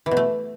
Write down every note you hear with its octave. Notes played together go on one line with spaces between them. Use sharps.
E3
B2
A3